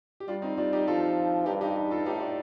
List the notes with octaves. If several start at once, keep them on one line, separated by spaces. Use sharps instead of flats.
G4
G3 D4 F4
C4 D#4
G3 D4 F4
D#4 G4
F3 F4 A4
G2 D#4 G4
D#4 G4
D#4 G4
F4 A4
A2 D#4 G4
D4 F4